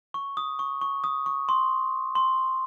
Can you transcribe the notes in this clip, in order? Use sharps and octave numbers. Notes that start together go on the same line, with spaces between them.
C#6
D#6
C#6
C#6
D#6
C#6
C6
C6